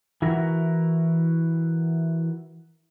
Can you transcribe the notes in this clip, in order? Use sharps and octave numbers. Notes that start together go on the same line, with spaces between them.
E3 E4 F#4 A#4